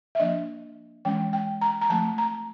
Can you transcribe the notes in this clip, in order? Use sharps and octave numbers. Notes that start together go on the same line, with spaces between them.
E5
F3 A#3 D4 D#5
E3 G#3 C#4 G5
G5
A#5
A#5
F3 A3 C4 A5
A#5